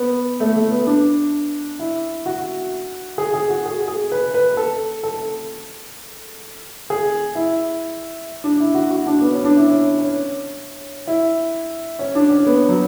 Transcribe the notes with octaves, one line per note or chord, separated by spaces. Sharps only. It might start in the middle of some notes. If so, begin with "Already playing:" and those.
Already playing: B3
A3
A3
B3
D4
E4
F#4
G#4
G#4
F#4
G#4
G#4
B4
B4
A4
A4
G#4
E4
D4
E4
F#4
F#4
D4
B3
C#4
D4
E4
C#4
C#4
E4
C#4
D4
C#4
B3
F#3